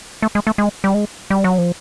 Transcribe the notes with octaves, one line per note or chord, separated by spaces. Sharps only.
A3
G#3
A3
G#3
G3
G#3
G3
F#3
F3